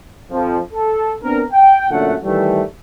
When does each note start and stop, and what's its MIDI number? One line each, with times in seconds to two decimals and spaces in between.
0.31 0.57 41
0.31 0.57 53
0.73 1.12 69
1.22 1.41 59
1.22 1.41 60
1.22 1.41 62
1.22 1.41 70
1.52 1.87 79
1.90 2.14 42
1.90 2.14 46
1.90 2.14 50
1.90 2.14 57
1.90 2.14 78
2.23 2.61 51
2.23 2.61 52
2.23 2.61 55
2.23 2.61 57